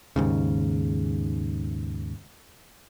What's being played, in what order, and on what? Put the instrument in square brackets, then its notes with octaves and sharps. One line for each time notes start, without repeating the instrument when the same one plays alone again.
[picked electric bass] D#2 G#2 C#3